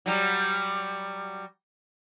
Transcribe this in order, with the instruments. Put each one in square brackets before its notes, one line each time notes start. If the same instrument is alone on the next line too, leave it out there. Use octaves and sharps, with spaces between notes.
[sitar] F#3 G3